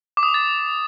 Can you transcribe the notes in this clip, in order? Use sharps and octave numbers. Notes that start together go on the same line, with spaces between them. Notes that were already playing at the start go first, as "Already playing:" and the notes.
D6
D#6
D6
A6